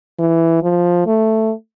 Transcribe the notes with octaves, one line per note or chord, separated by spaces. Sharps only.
E3
F3
A3